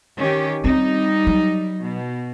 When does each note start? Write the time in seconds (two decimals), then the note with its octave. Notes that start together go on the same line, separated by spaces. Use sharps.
0.17 D#3 C#4 G4
0.64 G3 C4 D#4 F4
1.27 F#3
1.81 B2